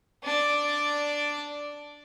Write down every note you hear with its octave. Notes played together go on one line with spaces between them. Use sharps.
D4 D5